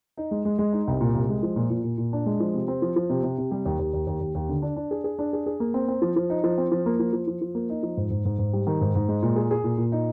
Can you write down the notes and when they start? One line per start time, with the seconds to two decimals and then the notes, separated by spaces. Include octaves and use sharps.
0.17 D#4
0.31 G#3
0.45 G#3
0.59 G#3
0.73 D#4
0.88 C2
1.01 A#2
1.14 C2
1.29 G#3
1.43 F3
1.56 A#2
1.70 A#2
1.84 A#2
1.98 A#2
2.13 D4
2.26 G#3
2.40 F3
2.54 C3
2.68 C4
2.82 F3
2.96 F3
3.10 C3
3.23 C3
3.38 C3
3.51 G3
3.65 D#2
3.79 D#2
3.94 D#2
4.07 D#2
4.21 D#2
4.35 D#2
4.49 D3
4.62 D4
4.76 D4
4.91 G#4
5.04 G#4
5.19 D4
5.33 G#4
5.46 G#4
5.60 A#3
5.74 C4
5.88 C4
6.02 F3
6.16 F3
6.30 D#4
6.44 F3
6.58 C4
6.72 F3
6.86 A#3
6.99 F3
7.13 F3
7.27 F3
7.41 F3
7.55 A#3
7.70 D#4
7.83 F3
7.97 G#2
8.10 G#2
8.25 G#2
8.39 G#2
8.53 G3
8.67 D#3
8.81 G#2
8.95 G#2
9.08 G#3
9.22 A#2
9.36 G#4
9.51 G#4
9.64 A#2
9.78 A#2
9.92 D#4